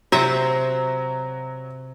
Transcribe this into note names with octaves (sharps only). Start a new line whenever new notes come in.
C3 F#3 C5 E5